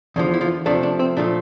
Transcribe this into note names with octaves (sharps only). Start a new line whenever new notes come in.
E2 D3 F3
E4
F3 F4
C3 F3 A3 D4
D4
C4
A#2 F3 A3 D4